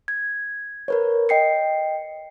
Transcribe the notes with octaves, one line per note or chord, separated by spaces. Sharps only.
G#6
A#4 B4 C#5
D#5 G5 C7 C#7